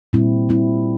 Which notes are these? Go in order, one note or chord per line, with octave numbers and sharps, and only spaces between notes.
A#2 G3 C4 E4
G3 C4 E4